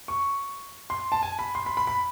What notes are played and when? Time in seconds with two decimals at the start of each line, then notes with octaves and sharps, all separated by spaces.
0.08 C#6
0.90 C6
1.12 A5
1.23 G#5
1.39 B5
1.55 C6
1.66 B5
1.77 B5
1.87 B5